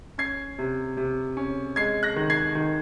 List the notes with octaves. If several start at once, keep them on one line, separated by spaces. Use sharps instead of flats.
C#4 G#6 C7
C3
C3
C#4
G#3 G#6 C7
F#6 A#6
D#3
G#6 C7
D#3